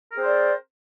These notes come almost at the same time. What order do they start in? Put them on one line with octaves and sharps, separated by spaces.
A#4 G#4 C4 C5 D5